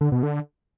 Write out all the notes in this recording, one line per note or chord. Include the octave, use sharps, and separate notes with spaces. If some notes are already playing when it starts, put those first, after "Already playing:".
D3
B2
D3